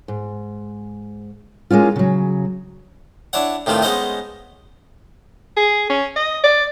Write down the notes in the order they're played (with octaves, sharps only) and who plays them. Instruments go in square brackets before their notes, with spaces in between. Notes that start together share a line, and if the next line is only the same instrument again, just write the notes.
[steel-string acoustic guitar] G#2
G#3 A#3 C#4 F4
C#3 F#3
[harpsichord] D4 E4 C#5 F#5
A2 C3 D#3 A3 F4
G#3 B3 C#4 D#4 C5 D#5
[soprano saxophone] G#4
C#4
D#5
D5